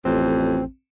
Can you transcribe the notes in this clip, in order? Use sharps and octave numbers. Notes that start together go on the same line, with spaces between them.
A1 F2 C4